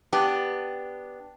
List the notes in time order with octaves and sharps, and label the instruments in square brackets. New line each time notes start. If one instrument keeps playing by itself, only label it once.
[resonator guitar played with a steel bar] B3 D4 G4